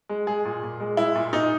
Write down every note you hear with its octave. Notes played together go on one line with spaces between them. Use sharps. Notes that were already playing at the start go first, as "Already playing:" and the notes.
G#3
G#3 G#4
A#2
A#2
G#3
G#3 E4
A#2
A#2 D#4